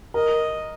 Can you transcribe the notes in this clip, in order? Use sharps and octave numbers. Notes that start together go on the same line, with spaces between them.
A#4 D#5